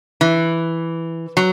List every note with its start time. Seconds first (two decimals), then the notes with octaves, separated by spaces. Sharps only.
0.21 E3
1.37 F#3